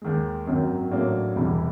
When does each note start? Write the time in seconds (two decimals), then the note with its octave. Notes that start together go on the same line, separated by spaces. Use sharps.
0.02 D#2 D#3 G#3
0.47 G#1 F#2 D#3 F#3
0.91 A1 A2 F#3 A#3 D4
1.36 E1 E2 C3 E3 G3